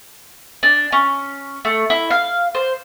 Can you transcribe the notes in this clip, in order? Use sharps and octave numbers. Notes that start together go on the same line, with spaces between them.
D4
C#4
A3
E4
F5
C5